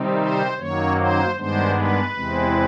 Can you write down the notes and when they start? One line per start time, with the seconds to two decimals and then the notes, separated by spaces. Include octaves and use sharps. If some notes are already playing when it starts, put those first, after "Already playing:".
Already playing: C3 D#3 G3 C4 D#4
0.19 C5
0.58 F#2 D#3 F#3 A#3 C#5
0.98 C5
1.36 G2 D#3 G#3 B3 D4 C5
1.75 B4
2.14 E2 C3 E3 G#3 C4